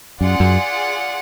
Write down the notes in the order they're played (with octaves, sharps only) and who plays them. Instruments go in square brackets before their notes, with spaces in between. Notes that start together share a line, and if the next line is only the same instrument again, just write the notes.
[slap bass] F#2 [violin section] F4 G#4 D5 F#5
[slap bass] F#2